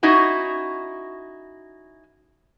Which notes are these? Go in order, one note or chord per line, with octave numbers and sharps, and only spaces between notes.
C#4 D#4 E4 F#4